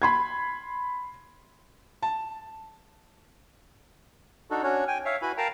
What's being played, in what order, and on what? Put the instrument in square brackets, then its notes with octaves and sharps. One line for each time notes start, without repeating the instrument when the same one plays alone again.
[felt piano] B5 C6 G#6
A5
[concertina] D4 D#4 F#4 A4
C#4 D4 F#4 C#5
G5 G#5
C#5 E5 F5
E4 F#4 B4 G#5 B5
A#4 F5 G5 A5 A#5